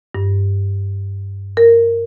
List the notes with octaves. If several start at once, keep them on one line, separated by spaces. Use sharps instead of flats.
G2
A#4